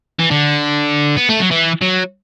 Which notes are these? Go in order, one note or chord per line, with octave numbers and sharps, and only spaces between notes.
E3
D3
B3
A3
F#3
E3
F#3